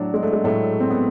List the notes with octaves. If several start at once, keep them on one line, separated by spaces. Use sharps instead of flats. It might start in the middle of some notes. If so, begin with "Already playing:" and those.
Already playing: A2 F#3 D4
G#3
A3
G#3
A2 F#3 A3
C4
B3